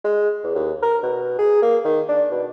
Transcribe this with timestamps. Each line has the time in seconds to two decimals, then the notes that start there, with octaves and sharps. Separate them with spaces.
0.04 G#3
0.43 E2
0.55 D#2
0.82 A#4
1.03 B2
1.39 G#4
1.62 A#3
1.85 D#3
2.08 D4
2.31 B2